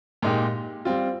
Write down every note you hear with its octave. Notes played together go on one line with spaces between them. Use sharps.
A#2 G#3 D#4 G4
G3 C4 F4